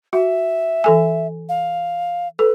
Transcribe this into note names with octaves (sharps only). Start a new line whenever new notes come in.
F#4 E5
E3 A4 G#5
F5
A4 B4